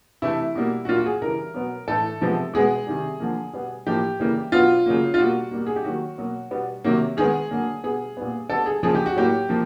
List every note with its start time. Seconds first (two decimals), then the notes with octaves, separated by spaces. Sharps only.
0.22 C3 E3 A3 E4
0.55 B2 G3 A#3
0.85 F#4
0.88 A#2 F#3 A#3 F4
0.97 F#4
1.06 G#4
1.22 C#3 E3 G3 A#4
1.54 B2 F#3 B3
1.88 A2 E3 A3 A4
2.21 C3 F3 G#3 B3
2.54 B2 G#3 B3 G#4
2.87 C3 D#3 G3
3.20 D3 F3 A#3
3.53 B2 G3 B3
3.86 A2 F3 A#3 G4
4.20 C#3 E3 G3 A#3
4.52 B2 F#3 B3 F4
4.86 C#3 F#3 A#3
5.14 F4
5.18 B2 G3 A#3 F#4
5.51 B2 G3 A#3
5.67 G#4
5.76 G4
5.84 D#3 F#3 A#3 F#4
6.18 B2 F#3 A#3
6.51 B2 G3 B3
6.84 C3 D#3 F#3 A#3
7.17 D#3 G#3 B3 G#4
7.51 D3 F#3 A#3
7.84 B2 G3 B3 G#4
8.17 A#2 G3 B3
8.49 D3 G3 B3 A4
8.66 G#4
8.83 C#3 F3 A#3 G#4
8.95 G4
9.06 F#4
9.16 A2 F#3 A#3 G4
9.49 F3 A#3